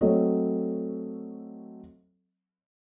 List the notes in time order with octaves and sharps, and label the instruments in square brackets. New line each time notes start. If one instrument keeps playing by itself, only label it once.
[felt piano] F#3 A3 C4 A4 C#5 D#5